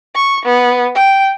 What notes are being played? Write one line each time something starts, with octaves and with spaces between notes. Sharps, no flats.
C#6
B3
G5